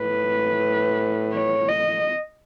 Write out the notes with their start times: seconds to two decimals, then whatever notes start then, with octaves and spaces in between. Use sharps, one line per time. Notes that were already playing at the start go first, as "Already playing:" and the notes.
Already playing: A2 B4
1.34 C#5
1.69 D#5